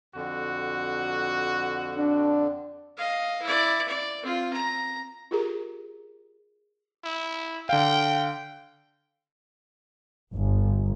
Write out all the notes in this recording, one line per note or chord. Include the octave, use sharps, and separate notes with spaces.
F2 D3 F#4
D4
D#5 F5
E4 D5
D5
C4 F4
A#5
F4 G4 G#4 A#4 A#5
E4
D3 F5 G5
G1